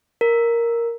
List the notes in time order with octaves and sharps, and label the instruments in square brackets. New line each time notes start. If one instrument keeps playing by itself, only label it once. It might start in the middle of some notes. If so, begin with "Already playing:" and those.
[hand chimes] A#4